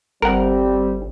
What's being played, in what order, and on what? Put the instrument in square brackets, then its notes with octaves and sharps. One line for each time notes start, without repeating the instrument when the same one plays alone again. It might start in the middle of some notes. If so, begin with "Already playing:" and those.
[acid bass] G1 [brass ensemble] G3 C4 [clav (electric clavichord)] A#4 F#5